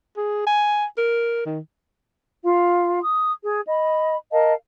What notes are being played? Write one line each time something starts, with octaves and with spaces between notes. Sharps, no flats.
G#4
G#5
A#4
D#3
F4 F5
D#6
G#4
D#5 B5
A#4 D#5 F5 A5